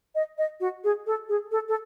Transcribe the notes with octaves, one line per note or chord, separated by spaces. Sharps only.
D#5
D#5
F#4
G#4
A4
G#4
A4
A4